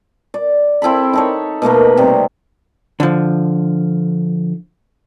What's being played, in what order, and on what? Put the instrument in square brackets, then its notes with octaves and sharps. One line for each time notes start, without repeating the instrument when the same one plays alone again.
[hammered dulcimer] D5
C4 E4 A4 B5
D#4 A4 C#5
B2 A3 A#3 B4
C3 G3
[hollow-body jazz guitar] D3 F3